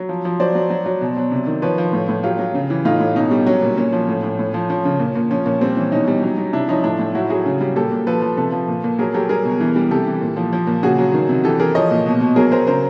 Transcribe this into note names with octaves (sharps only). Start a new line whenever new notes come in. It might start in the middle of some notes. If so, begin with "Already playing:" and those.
Already playing: F#3
F3
F3
F#3 C5 D5
F#3
F#3
F#3
B2
F#3
C3
D#3
F3 B4 C#5
F3
A2
A2
F#3 F4 G4
F#3
C#3
E3
A2 D#4 F4
A2
B2 C#4 D#4
G3
F#3 C#4
A#2
A#2 C#4
F3
A2
A2
A2
F3
F3 C#4
C#3
A#2
A#2
F3 C#4
A#2 C#4
G3 C4
E3 C#4
B2 C#4 D#4
G3
F#3
F#3
C3 D4 E4
F3 C#4 D#4
A2 D4 E4
A2
F#3 E4 F#4
F#3 F#4 G#4
C#3
G3
A#2 G4 A4
A#2
F3 A4 B4
F3
C3 A4 B4
F3
A#2
A#2
F#3 G#4 A#4
F#3 G4 A4
G3 G#4 A#4
B2
E3
G3
C3 G4 A4
E3
A#2
F3
F3
A#2
C#3 F#4 G#4
F#3
D#3
C3
E3 G4 A4
E3 G#4 A#4
F3 C#5 D#5
A#2
B2
B2
F#3 G#4 A#4
F#3 A#4 C5
C#3 A#4 C5